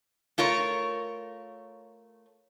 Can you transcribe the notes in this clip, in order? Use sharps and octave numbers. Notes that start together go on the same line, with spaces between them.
A3 F4 A#4 C#5